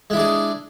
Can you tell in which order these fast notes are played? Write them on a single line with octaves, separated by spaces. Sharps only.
G#3 E4 D4 G#4